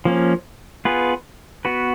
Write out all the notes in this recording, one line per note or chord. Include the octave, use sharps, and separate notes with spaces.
F3 A#3 C#4
B3 F4 G#4 B4
B3 F#4 B4